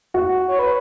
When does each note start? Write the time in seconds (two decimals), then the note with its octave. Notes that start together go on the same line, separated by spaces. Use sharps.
0.14 F#4
0.48 C#5
0.59 B4